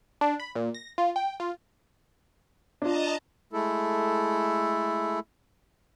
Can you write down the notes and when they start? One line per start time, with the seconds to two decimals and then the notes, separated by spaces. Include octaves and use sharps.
0.21 D4
0.40 B5
0.56 A#2
0.75 A#6
0.98 F4
1.16 G5
1.40 F4
2.82 D4 F4 D#5 A5 A#5
3.53 G#3 A3 E4 A4